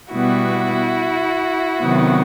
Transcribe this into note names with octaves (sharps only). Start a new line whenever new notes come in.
B2 G3 B3 E4 F#4
C3 D#3 F#3 B3